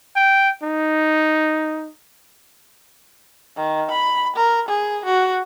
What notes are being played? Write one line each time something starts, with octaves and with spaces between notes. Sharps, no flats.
G5
D#4
D#3
B5
A#4
G#4
F#4